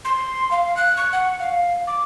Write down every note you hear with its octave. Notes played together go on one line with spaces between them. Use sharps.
C6
F5
F#6
C#6
F#5
F5
D6